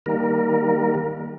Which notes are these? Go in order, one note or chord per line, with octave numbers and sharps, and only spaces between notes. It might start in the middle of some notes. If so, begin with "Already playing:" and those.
D#3 G3 A#3 A#4